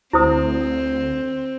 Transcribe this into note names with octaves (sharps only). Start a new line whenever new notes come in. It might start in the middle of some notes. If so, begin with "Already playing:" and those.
D2 C4 E4 C5 D#6